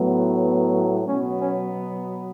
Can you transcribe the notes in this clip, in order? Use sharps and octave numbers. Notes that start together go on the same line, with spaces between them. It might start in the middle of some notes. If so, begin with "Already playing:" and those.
Already playing: A2 F#3 B3
B2 F#3 B3 C#4
C#4